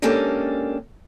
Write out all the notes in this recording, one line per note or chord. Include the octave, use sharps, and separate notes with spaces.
G#3 A#3 C#4 D4 G4 A4